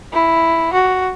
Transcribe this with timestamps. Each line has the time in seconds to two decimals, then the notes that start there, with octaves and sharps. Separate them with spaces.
0.13 E4
0.73 F#4